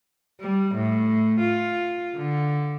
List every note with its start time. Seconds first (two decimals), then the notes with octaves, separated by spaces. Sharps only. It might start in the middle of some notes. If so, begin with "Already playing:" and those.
0.40 G3
0.75 A2
1.40 F4
2.17 D3